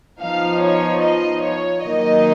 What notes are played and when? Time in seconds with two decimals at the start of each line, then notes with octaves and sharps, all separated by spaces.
0.20 F3 B3 D#4 F5
0.62 C#5
1.02 D#5
1.43 C#5
1.84 D#3 F#3 A#3 D#4 D#5